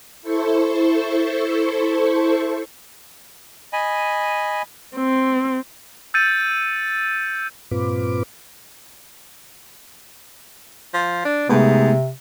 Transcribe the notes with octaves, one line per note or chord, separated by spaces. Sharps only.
E4 A4 C5 C#6
D#5 G#5 B5
C4
E6 G6 A6 C#7 D#7
G2 A#2 C4 F4 B4 D6
F3
D4
G#2 C3 G#3 A3 B3